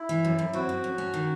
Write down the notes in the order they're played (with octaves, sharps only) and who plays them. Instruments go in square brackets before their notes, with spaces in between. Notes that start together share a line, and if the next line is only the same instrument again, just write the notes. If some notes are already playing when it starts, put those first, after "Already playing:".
Already playing: [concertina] E4
[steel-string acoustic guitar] E3
F#2
F#2
[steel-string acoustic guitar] C4 [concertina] F#4
[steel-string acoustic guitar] F#2
F#2
C#4
D#3